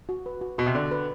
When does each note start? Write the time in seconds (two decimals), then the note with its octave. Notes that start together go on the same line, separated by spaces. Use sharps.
0.09 F#4
0.26 B4
0.41 F#4
0.58 B2 F#4
0.66 C3
0.75 D3 D5
0.91 B4